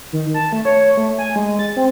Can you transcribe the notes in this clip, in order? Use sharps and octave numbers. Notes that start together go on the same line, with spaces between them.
D#3
A5
A3
C#5
A3
G#5
G#3
A6
C4